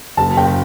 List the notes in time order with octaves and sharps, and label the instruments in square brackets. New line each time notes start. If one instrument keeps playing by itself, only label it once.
[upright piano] F#1 A5
F#1 G5